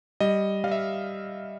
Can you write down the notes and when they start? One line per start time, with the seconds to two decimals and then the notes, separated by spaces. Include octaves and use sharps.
0.20 G3 D#5
0.64 G3 F5
0.71 E5